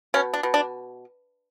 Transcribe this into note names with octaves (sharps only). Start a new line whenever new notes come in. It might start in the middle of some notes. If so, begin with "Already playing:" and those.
B2 C#4
D4
B2
D4